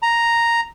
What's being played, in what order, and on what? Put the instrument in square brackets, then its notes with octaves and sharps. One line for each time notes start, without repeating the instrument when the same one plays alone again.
[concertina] A#5